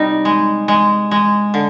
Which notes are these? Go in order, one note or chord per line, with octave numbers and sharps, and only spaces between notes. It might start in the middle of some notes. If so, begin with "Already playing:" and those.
Already playing: C3 G3 D#4
G#3
G#3
G#3
D3